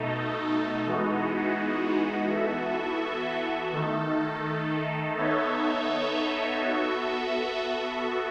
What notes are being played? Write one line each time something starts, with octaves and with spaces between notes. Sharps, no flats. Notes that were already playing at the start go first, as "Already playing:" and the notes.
Already playing: B2 A3 D#4 A4
E3 G#3 B3 D#4 F#4
E3 B3 F#4 A4 E5
D#3 A3 D#4 A4
B3 D#4 A4 C#5 E5
B3 F#4 A4 E5